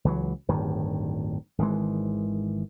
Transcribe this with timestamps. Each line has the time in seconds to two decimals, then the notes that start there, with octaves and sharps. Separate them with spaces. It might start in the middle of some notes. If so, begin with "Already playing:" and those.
0.05 C#2 E3 F#3
0.48 D1 G1 G2 D#3
1.58 G#1 D#3 E3 G#3